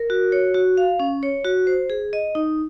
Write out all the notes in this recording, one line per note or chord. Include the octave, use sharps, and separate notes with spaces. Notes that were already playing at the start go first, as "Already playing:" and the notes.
Already playing: A#4
F#4
C#5
F#4
F5
C#4
C#5
F#4
C5
G#4
D#5
D#4